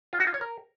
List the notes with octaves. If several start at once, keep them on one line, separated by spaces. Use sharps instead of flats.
F4
F#4
F4
C#5
A#4